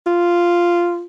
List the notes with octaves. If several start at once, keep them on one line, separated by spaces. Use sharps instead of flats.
F4